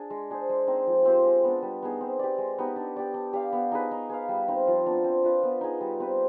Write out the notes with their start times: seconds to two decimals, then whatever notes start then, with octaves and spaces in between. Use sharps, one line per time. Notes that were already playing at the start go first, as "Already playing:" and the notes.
Already playing: D4 G#4
0.10 G#3
0.31 D4 G#4 C5
0.50 G#3
0.67 C4 D#4
0.87 F3
1.05 C4 G4 C5
1.25 G#3
1.44 B3 D4
1.63 G3
1.82 B3 D#4 G#4
2.01 C4
2.19 G4 D5
2.38 G#3
2.58 B3 D#4 G4
2.76 D4
2.96 G4 D5
3.14 D4
3.33 G4 D5 F5
3.53 B3
3.72 D#4 G#4 B4
3.91 D#4
4.10 G#4 B4 F5
4.29 G3
4.48 C4 D#4
4.67 F3
4.86 B3 D4
5.04 C4
5.24 F4 B4 F5
5.43 B3
5.61 D#4 G#4
5.81 G3
6.00 C4 G4 B4